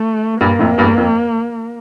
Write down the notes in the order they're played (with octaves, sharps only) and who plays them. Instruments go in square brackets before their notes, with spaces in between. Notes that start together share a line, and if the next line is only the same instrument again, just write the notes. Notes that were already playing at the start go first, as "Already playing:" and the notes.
Already playing: [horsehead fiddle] A3
[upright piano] G2 A#2 [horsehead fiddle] A#3
[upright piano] F2 A2
E2 G2
F2